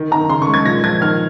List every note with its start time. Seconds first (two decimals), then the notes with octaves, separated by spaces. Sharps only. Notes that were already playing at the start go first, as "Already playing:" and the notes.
Already playing: D#3
0.11 D#3 A#5
0.29 C#3 C6
0.42 C#6
0.48 G#3
0.54 G#6
0.66 A#2 A#6
0.84 F3 G#6
1.01 D#3 F6